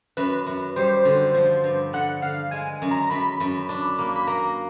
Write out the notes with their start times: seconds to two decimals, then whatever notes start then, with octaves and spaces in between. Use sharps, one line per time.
0.17 F#2 B4
0.46 F#2
0.76 G3 C5
1.05 D3
1.34 F3
1.64 G2
1.93 D3 F#5
2.22 D3 F5
2.51 G#3 G#5
2.82 F#2
2.91 A#5
3.10 F#2 B5
3.40 F#2
3.69 D4
3.99 A#3
4.16 B5
4.27 A#3 A#5